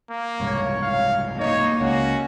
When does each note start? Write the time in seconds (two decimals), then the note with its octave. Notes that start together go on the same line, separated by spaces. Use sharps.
0.10 A#3
0.40 F#1 C2 G#2 C#5
0.82 F5
1.40 A#3 D#4 C#5
1.81 C#2 C#4 F#4